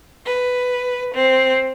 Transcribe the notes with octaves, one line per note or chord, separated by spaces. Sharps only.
B4
C4